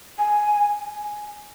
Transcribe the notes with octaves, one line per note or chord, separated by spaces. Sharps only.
G#5